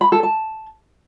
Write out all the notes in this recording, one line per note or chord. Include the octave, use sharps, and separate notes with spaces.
B5
A4
A5